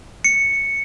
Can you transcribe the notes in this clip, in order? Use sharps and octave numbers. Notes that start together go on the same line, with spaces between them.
C#7